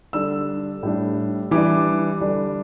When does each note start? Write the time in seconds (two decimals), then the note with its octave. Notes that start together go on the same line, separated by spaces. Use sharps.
0.13 D3 G3 D4 E6
0.83 A2 G3 D4
1.51 E3 G3 D4 D6
2.21 D3 G3 D4